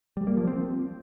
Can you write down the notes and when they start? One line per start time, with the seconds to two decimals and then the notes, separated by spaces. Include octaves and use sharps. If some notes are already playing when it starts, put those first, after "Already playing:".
0.17 G3
0.27 A#3
0.37 F3
0.47 C4